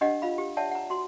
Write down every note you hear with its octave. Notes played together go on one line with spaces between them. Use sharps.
D4 G4 D#5 F#5
F4 F5 B5
G4
C#5 D5 E5 F#5 A5
F#5 A#5
F#4 C6